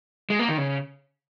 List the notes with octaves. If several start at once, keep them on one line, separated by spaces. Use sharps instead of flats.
G#3
A#3
D#3
C#3